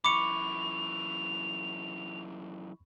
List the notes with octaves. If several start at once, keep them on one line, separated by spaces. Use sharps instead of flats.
F#2 E3 B5 C#6 D6 C#7 F7